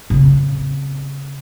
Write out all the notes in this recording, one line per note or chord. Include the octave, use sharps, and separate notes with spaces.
C#3 C4